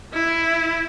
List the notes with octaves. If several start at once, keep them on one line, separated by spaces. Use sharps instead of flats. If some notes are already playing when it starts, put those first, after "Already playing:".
E4